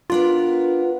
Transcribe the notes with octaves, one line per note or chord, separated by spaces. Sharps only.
B3 D4 F4 A#4